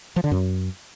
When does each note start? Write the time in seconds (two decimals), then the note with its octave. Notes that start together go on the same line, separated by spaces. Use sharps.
0.16 F3
0.24 D3
0.31 F#2